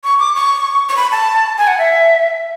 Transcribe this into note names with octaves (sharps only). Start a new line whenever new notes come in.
C#6
D6
C#6
C#6
B5
A5
G#5
F#5
E5